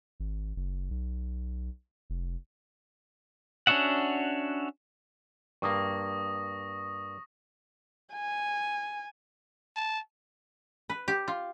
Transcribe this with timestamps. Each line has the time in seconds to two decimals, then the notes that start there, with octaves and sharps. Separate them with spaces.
0.20 G#1
0.56 F#1
0.91 B1
2.10 F1
3.67 C#4 D4 F#4 E5 F#5
5.62 G2 A#3 C#6 D#6 A#6
8.13 G#5
9.76 A5
10.90 B4
11.08 G4
11.28 F4